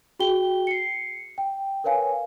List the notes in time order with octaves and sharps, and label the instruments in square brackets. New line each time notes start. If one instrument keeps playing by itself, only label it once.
[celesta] F#4 G#4 G5 G7
C7 C#7
G5
A#4 B4 C#5 F5 G#5